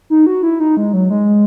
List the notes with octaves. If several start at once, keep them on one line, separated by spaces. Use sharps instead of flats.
D#4
F#4
E4
D#4
G#3
F#3
G#3